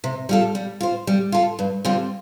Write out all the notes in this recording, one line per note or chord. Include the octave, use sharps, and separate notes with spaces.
C3
G3 F4 A4
G3
F4 C5
G3
F4 A4
G2
D3 G3 C4 F4